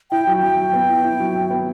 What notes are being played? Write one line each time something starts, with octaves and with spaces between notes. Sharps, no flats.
E4 G5
F#3
F#3 G5
F#3
B3
E4
E4
F#3
F#3
B3